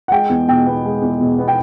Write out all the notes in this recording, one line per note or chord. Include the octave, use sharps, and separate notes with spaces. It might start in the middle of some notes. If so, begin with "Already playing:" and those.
F#5
G#3 G5
E2
B2 G5
B3
G#3
E2
B2
B3
G5